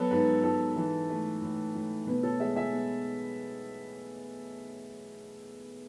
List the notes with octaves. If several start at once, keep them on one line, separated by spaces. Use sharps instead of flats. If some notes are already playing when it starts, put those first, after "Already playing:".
Already playing: F#3 B3 A4 B4 C#5
G#2 B4
G#2 A4
E3
A3
A2
A2
B2 B4
A4 C#5
G#3 C#5 E5
E5 G#5
B3